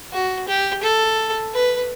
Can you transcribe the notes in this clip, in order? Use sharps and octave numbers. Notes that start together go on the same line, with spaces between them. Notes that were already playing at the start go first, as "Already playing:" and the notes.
F#4
G4
A4
B4